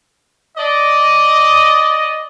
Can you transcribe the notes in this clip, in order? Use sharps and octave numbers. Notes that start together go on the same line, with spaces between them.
D5 D#5